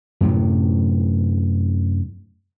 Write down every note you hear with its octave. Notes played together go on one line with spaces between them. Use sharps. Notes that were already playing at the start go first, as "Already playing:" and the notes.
F#2 A2 C3 F#3